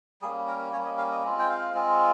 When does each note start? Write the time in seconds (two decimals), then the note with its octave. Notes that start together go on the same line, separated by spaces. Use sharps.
0.22 G3 A#3 C#4 G#4
0.47 A#4
0.73 G3 A#3 C#4 C#5
0.85 D#5
0.98 F5
1.11 D#5
1.24 G#3 C4 F4
1.39 G5
1.50 F5
1.74 G#3 C4 F4